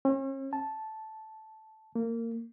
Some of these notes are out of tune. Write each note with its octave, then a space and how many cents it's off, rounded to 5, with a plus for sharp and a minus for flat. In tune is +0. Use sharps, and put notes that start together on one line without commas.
C#4 -45
A5 -5
A#3 -20